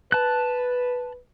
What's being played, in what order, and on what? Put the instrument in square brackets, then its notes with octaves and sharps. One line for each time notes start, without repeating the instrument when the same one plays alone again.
[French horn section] B4 [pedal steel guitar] A5 F#6